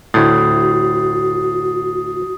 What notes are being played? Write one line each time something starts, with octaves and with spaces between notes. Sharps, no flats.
D2 A2 F#4 D#6 A6 C7